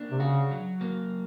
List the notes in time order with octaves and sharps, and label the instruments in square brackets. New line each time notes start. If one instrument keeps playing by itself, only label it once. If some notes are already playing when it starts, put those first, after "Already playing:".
Already playing: [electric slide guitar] A#3 D4
[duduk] C3
[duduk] C#3 [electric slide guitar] F#4
[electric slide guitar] F#3
A#3